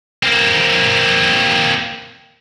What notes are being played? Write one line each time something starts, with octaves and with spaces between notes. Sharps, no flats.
A#3 C4